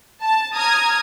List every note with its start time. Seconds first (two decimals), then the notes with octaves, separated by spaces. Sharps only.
0.22 A5
0.56 A#5 D#6 F6 G#6